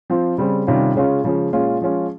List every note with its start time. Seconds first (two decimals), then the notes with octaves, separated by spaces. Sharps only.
0.10 F3 C4 F4
0.38 C#3 G3 C4
0.67 C3 D#3 G3 C#4 F4
0.95 C#3 G#3 C#4 F4
1.24 C#3 F3 G#3 C#4
1.53 A#2 G#3 C#4 F4
1.82 F3 G#3 C#4 F4